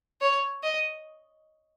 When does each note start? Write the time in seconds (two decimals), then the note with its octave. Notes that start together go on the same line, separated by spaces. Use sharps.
0.21 C#5
0.64 D#5